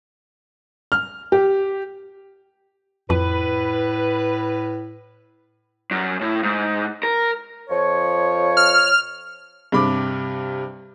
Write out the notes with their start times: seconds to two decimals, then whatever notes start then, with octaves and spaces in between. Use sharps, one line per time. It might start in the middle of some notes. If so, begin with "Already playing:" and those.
0.92 F6
1.32 G4
3.10 F2 A2 B4
5.91 F#2
6.21 A2
6.43 G#2
7.03 A#4
7.70 F2 F3 C#5
8.57 F6
9.72 G2 C3 B5 D6